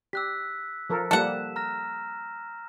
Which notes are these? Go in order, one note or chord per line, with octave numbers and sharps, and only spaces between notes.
G4 E6 F#6 B6
F3 A4 A#4
F3 G3 A#3 A4 F#5 E7
A#5 F6 A#6